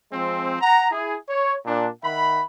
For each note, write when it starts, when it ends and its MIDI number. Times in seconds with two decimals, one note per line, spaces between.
0.12 0.57 53
0.12 0.57 56
0.12 0.57 60
0.61 0.90 78
0.61 0.90 82
0.91 1.15 64
0.91 1.15 68
1.29 1.55 73
1.65 1.87 46
1.65 1.87 62
2.02 2.42 51
2.02 2.42 76
2.02 2.42 78
2.02 2.42 83